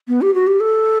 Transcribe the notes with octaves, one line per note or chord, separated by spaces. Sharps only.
B3
G4
F#4
G4
A4